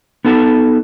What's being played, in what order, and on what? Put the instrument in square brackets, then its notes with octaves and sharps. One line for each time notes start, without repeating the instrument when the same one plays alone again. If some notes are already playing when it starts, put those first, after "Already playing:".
[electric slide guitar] B3 D#4 A4 A5